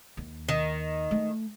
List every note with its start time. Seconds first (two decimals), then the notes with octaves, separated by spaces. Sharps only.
0.17 D#2
0.49 D#3
1.11 A3